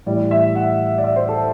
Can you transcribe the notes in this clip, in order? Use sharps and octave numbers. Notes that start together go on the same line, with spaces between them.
A2 E3 G3 D5
E5
F#5
D5
E5
C5
A4